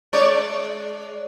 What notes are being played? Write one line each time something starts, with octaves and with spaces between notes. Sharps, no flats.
G#3 C#5 D5